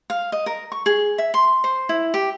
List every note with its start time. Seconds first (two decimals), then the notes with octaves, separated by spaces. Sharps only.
0.10 F5
0.32 D#5
0.46 A#4
0.72 C#6
0.86 G#4
1.18 E5
1.34 C6
1.64 C5
1.89 E4
2.14 G4